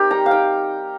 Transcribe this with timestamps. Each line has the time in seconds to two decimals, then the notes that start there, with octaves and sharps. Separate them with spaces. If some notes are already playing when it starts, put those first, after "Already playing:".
Already playing: C4 D#4 G4 A#4
0.11 G3 A#5
0.26 F5
0.31 D#4 G5